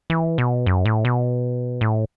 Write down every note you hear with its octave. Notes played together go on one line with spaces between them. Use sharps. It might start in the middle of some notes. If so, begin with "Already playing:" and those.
E3
B2
F#2
A2
B2
A2